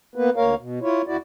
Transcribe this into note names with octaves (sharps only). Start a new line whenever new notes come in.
A#3 B3 B4
D2 A#3 A#4 C#5 F5
B2
E4 F4 C#5
D2 E4 F#4 D5